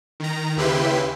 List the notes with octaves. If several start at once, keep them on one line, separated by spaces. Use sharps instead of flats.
D#3 A#5
D#2 C#3 E4 G4 B4 C6